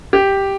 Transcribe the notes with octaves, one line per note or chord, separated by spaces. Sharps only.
G4